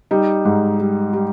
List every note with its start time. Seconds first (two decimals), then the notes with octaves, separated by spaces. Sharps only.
0.11 G3 D#4
0.45 G#2
0.79 G3
1.13 G3